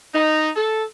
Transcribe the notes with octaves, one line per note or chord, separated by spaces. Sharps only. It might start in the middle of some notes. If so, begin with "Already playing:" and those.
D#4
A4